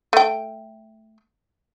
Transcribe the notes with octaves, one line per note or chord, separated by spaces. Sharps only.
A3 G5